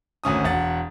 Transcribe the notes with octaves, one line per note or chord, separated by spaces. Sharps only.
G#1 D2 C#4 D#6
E1 F#5 A6